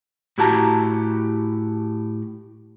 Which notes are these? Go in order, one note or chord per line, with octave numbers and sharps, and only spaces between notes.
A2 E4 F#4 G4 A5 A#5